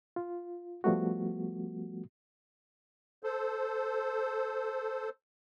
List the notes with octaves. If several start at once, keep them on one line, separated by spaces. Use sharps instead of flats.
F4
F3 G3 A3 B3 F#4
A4 C5